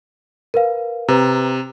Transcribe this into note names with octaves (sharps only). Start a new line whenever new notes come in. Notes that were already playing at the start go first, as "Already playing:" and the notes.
A#4 B4 F5
C3 B4 A#5